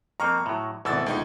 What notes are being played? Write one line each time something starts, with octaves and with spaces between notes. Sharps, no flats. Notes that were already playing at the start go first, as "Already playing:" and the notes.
F2 A#3 C4 A#5 C#6 F6
A2 F#3
G#1 D2 B2 E3 E6 A6
C#2 D#4